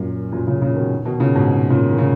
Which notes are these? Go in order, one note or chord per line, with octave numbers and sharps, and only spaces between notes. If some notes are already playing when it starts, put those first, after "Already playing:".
Already playing: F#2 A#2
F#2 A#2
A#2 C#3
A#2 C#3
B2 D#3
B2 D#3
A#2 C#3
G#2 B2
A#2 C#3
D#3
C#3